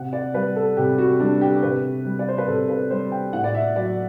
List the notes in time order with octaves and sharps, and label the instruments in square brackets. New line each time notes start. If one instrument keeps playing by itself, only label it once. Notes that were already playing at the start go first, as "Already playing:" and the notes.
Already playing: [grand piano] C3 F#5
D5
G3 B4
A4
C3 G4
F#4
G3 D4
G4
C3 B4
G3
D5
C5
B4
C3 A4
B4
G3 C5
G5
A2 F#5
D5
E5
F#3 D5